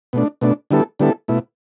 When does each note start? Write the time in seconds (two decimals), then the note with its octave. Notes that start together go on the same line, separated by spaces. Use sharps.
0.13 B2 A3 D4
0.42 B2 A3 D4
0.71 D3 G3 B3 E4 A4
1.00 D3 G3 B3 E4 A4
1.28 B2 A3 E4